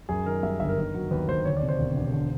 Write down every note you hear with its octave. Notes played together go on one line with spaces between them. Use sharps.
F#2 G#4
D#3 A#4
G3 E5
G1 E5
A#4
D#3
F#3
D#2 B4
D#2 C5
D2 C#5
D5
C3
C5
E1
E1
D3